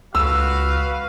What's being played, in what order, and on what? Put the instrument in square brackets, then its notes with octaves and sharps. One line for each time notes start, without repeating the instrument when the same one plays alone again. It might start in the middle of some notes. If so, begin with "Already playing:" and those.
[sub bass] C#2 [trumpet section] F#4 B4 F5 [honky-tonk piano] E6